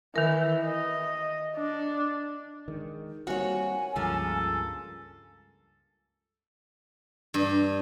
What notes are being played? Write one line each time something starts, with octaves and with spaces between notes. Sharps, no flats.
D#3 E3 A#4
D#5
D4
D#3 G#3
G3 A#3 C4 F#4 C#5 G#5
C#2 G2 C#3 F3 A#3 A4
G2